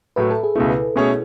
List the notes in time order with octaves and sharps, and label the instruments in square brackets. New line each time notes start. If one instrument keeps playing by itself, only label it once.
[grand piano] A2 F#3 A3 [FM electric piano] B4
[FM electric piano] A4
G#4
[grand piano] C#2 B2 A3 [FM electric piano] E4
[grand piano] B2 A3 C#4 G#4 C#5